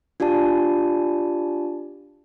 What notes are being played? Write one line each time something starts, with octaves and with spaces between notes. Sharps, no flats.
D4 F4 G4 D5 A5